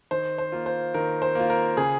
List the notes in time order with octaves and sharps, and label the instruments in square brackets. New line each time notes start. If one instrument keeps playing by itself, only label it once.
[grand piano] D#3 C5
C5
A#3 F4
C5
D#3 A#4
C5
A#3 F4
A#4
C#3 G#4